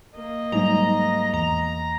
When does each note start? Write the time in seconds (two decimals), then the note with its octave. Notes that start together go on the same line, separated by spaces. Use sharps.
0.16 A#3 D#5
0.52 G#2 F#3 G3 D#4 A#5
1.33 E2 A#5